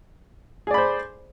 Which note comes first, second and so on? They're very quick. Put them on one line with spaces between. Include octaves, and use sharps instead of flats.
G#4 D5 B5 C5